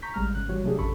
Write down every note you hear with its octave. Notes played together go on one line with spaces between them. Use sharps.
A#5 C#6 G6 B6
A1 G3 G#3 A#5 F6
G#1 C#3 F#6
E3 G3 F#4 C#5
C3 F#3 A3 D4 G4 G#4
A1 F2 C#3 A4 B5 C#6